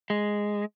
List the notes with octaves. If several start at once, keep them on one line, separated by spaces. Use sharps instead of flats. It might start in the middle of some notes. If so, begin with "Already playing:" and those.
G#3